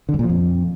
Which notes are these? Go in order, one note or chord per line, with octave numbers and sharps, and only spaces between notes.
D3
F#2
A#2
F3
F2